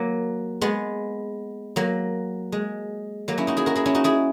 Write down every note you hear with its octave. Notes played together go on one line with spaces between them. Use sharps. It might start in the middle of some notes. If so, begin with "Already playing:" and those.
Already playing: F#3 A#3
G#3 B3
F#3 A#3
G#3
F#3 A#3
C#4 E4
D#4 F#4
E4 G#4
F#4 A#4
E4 G#4
C#4 E4
D#4 F#4
E4 G#4